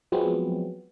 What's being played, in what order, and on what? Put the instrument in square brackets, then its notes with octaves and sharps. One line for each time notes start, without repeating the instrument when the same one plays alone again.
[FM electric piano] F3 F#3 G#3 B3 C4